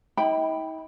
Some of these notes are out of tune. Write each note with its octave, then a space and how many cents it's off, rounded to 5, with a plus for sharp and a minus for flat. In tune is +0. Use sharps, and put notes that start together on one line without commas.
D#4 +45 G5 +0 B5 +0